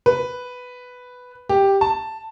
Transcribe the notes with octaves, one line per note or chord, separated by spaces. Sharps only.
B4
G4
A5